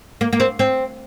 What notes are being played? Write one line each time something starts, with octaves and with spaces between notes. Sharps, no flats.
A#3
A#3
C4
C4